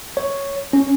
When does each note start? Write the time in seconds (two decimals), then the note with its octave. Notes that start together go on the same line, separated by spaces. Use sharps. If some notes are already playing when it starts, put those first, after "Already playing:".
0.17 C#5
0.73 C#4